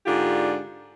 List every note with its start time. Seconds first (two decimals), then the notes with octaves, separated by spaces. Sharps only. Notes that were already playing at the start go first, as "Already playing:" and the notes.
0.06 G#2 D3 D4 F4 G4